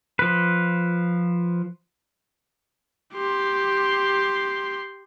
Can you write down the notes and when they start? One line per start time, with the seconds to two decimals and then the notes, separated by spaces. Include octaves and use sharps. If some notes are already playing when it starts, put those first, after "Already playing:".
0.19 F3 B4
3.14 G4 C6